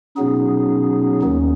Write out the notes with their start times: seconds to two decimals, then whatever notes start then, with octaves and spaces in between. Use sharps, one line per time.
0.16 B2 F#3 B3 C#4 D#4 G#4
1.22 D#2 D#3